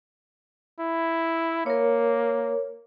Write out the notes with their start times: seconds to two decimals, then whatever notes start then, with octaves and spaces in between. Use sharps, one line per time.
0.80 E4
1.66 A#3 A#4 C#5